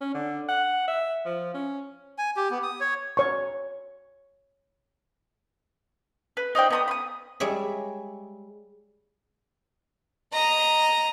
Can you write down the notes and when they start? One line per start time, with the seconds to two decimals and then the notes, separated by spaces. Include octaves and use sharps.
0.01 C#4
0.14 D3
0.48 F#5
0.87 E5
1.25 F3
1.54 C#4
2.18 G#5
2.36 G4
2.51 B3
2.63 D#6
2.80 C#5
3.17 C#5 C#6
6.37 B4
6.55 D#4 C5 D5 G5
6.70 B3 A#5 D#6
6.88 B5 D#6
7.40 G3 G#3 C#5 E5
10.33 D#5 A#5